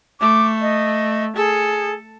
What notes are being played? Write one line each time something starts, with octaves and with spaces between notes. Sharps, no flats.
A3 D6
D#5
G#4 A4